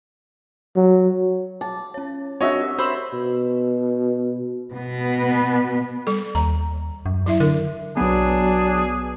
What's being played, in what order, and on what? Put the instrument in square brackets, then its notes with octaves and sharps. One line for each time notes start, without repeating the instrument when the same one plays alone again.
[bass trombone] F#3
[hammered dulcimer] A5 [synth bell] D6
[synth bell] C#4 C#5
[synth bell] C4 D4 A#4 [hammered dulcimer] F#4 E5 [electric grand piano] C#5 D#5
[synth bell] G4
[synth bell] F#4 C#6 F#7 [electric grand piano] C5 B5 E6
[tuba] B2
[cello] B2 B3
[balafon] G3 A4
[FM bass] D#2 [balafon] A#5
[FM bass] F#2
[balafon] F#3 E4 E5
[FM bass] D3 [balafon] A#4
[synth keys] B1 B3 [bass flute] F#3 [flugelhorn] D4 [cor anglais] G#4